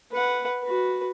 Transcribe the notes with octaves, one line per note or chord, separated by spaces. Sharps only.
B4 F#5
F#4 B4